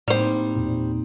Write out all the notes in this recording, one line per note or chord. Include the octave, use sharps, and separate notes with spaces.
A2 G3 A#3 C4 D#4 C5
E2 A#2